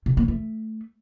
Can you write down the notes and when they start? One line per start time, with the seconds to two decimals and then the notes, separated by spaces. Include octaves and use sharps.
0.06 C3
0.17 A#3
0.28 A3